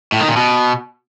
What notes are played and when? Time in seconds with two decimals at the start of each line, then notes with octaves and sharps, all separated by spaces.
0.12 A2
0.20 D#3
0.28 A#2
0.36 B2